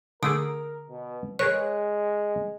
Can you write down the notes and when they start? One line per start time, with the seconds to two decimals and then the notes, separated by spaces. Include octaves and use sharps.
0.23 D3 A3 G#4 A#4 D#6 E6 D7
0.90 B2
1.39 G#3 G#4 A#4 B4 C#5 F#6